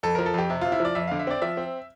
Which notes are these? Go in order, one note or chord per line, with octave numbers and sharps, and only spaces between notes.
F2 A4
F3 A#4
A4
F2 G4
C3
C3 F4
E4
F3 D5
F2 E5
D3 F5
E5
C4 D5
F3 E5
C4